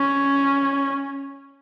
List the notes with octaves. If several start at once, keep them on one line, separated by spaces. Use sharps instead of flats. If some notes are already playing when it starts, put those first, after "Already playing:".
Already playing: C#4